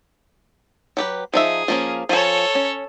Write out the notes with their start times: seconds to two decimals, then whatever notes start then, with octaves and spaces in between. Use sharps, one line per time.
0.97 F#3 G4 B4
1.34 F3 D#4 G#4 E5
1.68 F3 A#3 C#4
2.09 F3 A4 C#5 G#5
2.55 C#4